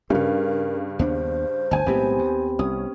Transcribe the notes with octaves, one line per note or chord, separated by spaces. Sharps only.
G2 C#3 C4 C#4 A#4
D#2 B3 D4 C5
G1 D2 G#5 A5
B1 A2 G#3 B3 C4 G4
D#2
C2 C#4 D#6